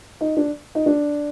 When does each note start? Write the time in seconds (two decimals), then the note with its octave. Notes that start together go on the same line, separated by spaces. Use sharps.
0.21 D#4
0.37 D4
0.75 D#4
0.86 D4